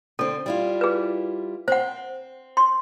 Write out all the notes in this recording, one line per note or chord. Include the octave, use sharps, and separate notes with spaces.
D3 C4 A4
G3 E4 F4
G#4 B4
C4 C5 F#5
C6